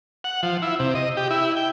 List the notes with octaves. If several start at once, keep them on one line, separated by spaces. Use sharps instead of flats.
F#5
F3
E4
C3
D#5
G4
E4
G5